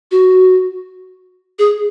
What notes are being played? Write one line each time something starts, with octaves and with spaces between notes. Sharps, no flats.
F#4
G#4